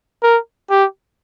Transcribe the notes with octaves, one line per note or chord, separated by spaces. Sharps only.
A#4
G4